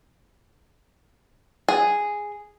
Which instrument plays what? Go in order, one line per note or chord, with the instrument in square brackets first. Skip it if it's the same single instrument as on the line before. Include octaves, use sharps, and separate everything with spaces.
[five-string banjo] G#4